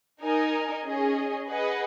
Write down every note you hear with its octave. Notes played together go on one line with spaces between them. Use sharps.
D#4 A#4 D#5 G#5
C#4 G#4 D#5
G#4 B4 D#5 F#5